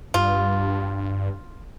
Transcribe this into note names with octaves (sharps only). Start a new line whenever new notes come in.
G2 F4